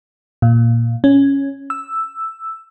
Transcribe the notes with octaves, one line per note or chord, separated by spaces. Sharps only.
A#2
C#4
E6